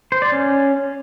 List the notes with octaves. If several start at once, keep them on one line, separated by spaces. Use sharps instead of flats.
C5
D5
C#4